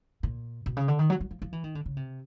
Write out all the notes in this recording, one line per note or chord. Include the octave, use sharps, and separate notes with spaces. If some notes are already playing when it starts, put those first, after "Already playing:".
A#2
B2
C#3
D3
D#3
F#3
F#3
F3
F3
E3
D#3
D3
C#3
C3